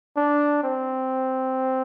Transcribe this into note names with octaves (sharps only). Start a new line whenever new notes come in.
D4
C4